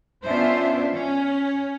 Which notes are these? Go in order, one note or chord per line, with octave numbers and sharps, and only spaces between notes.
B3 C#4 D4 F4 C5 E5
C#4